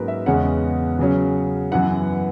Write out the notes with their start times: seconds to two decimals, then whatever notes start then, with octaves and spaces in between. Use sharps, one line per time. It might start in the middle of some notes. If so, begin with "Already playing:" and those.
Already playing: G#2 F#3 A#3 C#4 A#4 B4
0.08 E5
0.26 E2 C#3 G#3 C#4 F#5
0.99 C#3 F#3 C#4
1.71 F#2 E3 B3 F#5